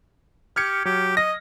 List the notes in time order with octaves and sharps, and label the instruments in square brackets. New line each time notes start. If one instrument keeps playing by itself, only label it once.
[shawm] G4 [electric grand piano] F6 G#6 C#7
[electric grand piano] F#3 [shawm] G4
[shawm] D#5 [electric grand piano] A#6